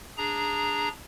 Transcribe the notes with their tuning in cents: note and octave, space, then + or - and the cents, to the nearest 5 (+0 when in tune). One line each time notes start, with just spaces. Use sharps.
D4 +0 G#4 -10 A#5 +0